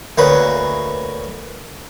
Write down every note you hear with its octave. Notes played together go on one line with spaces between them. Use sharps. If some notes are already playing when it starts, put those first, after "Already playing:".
D2 A#3 C#4 B4